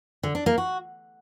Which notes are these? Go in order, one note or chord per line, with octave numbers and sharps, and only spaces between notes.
D3
D4
A#3
F#4